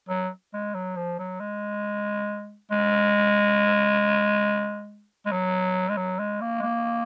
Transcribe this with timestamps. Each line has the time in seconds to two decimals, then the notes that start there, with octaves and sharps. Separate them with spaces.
0.09 F#3
0.54 G#3
0.75 F#3
0.97 F3
1.19 F#3
1.40 G#3
2.71 G#3
5.26 G#3
5.32 F#3
5.89 G#3
5.97 F#3
6.19 G#3
6.41 A#3
6.60 G#3
6.62 A#3